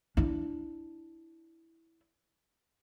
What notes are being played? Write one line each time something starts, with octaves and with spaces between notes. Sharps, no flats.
D4 E4